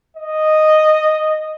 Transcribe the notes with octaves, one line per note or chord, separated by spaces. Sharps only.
D#5